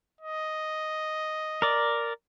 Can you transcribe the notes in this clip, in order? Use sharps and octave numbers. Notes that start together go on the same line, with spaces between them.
D#5
A#4 D5